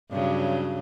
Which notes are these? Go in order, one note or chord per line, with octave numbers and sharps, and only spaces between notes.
G2 C#3 F#3